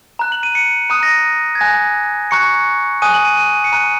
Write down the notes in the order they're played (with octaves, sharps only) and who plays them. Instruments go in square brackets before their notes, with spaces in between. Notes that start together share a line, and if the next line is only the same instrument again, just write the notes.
[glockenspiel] A#5 F#6
F#7
D#7
C#7
A#5 D#6 F#6 D#7
A#6
G#6
G#5 F#6 A#6
A#5 C#6 F#6 C#7
G#5 D#6 F#6 D#7
F#7
D#7
D#7
C#7
A#5 F#6 D#7